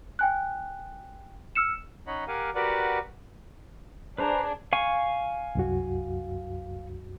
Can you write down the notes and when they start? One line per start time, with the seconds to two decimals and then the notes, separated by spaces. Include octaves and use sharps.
0.19 G5 G#5 F#6
1.55 E6 F6 C#7 E7
2.07 C#4 D#4 C#5 D#5 F#5 B5
2.28 G4 A#4 F5 F#5 G#5
2.55 F#4 G4 A#4 B4 D5 F#5
4.18 D4 G#4 B4 C5 A#5
4.73 F5 G#5 C#6
5.55 C2 F#2 F#4